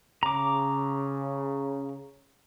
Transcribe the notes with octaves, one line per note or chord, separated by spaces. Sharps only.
C#3 A#5 D6